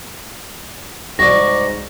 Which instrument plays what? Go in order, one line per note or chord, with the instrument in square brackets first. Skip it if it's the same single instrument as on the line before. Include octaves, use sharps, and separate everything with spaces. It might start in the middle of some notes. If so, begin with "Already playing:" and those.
[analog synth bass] C2 [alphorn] G#2 [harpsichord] F#4 D5 [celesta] A#6